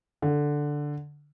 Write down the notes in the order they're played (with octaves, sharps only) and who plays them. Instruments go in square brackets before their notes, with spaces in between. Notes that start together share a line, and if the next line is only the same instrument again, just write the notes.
[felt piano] D3